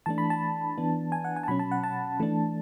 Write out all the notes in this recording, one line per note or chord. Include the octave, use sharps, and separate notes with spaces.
E3 A3 D4 A5
B5
A5
E3 B3 D4
G#5
F#5
G#5
A5
B2 F#3 C#4 B5
A5
F#5
A5
E3 A3 D4